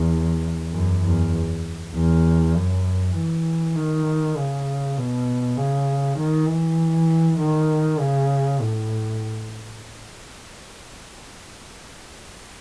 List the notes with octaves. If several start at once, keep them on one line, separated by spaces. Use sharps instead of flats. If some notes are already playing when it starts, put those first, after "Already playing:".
Already playing: E2
F#2
E2
E2
F#2
E3
D#3
C#3
B2
C#3
D#3
E3
D#3
C#3
A2